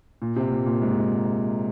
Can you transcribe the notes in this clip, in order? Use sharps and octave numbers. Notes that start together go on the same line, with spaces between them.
A#2
C3
A#2
A#2
G#2
A#2
G#2